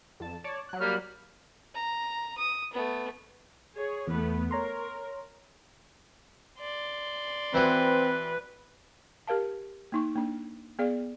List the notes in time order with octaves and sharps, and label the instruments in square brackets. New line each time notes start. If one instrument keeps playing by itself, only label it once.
[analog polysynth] F2 A5
C#5 D5 A5
F#3 F#6
[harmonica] G3 A#3 F6
[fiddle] A#5
D#6
A3 B3
[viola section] G#4 C#5
[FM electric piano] E2 [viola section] A3 B3 B4
[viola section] A#4 [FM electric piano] C#5 A#5 C6
[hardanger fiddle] D5 C6
[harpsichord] E3 E4 F#4 [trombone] C4 [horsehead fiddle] B4
[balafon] G4 A#4 F5 A5
A#3 D#4 C#6
A#3 D4
B3 G#4 D5 F5